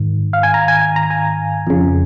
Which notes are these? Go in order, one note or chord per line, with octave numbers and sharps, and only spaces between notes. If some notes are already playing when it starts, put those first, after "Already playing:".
Already playing: G#2 D#3
F5
G#5
A#5
G#5
G#5
A#5
G#5
F2 C#3